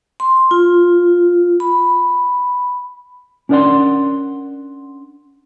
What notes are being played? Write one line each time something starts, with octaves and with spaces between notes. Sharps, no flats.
C6
F4
B5
C#4 D4 A#4 D5 F#5 C6